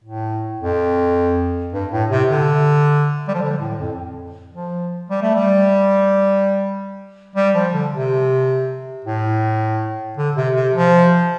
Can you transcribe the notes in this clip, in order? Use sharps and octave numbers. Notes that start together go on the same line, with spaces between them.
A2
F2
G2
A2
C3
D3
G3
F3
D3
A2
F2
F3
G3
A3
G3
G3
F3
D3
C3
A2
D3
C3
C3
F3